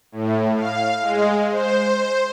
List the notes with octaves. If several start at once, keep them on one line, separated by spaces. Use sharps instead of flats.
A2
F5
G#3
C5